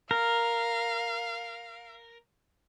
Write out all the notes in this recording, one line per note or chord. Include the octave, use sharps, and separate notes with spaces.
A#4 F5